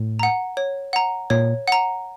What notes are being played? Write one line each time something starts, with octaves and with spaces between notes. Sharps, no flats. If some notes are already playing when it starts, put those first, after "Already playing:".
Already playing: A2
F#5 A#5
C#5
F#5 A#5
A#2 C#5
F#5 A#5